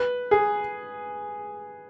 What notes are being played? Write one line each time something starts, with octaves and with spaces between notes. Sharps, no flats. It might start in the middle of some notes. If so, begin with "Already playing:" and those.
Already playing: B4
G#4